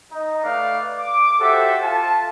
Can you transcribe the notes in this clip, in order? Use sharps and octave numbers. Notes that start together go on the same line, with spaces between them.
D#4
A3 B4 D5 F5
D6
F#4 G4 A4 C5 E5
F4 A5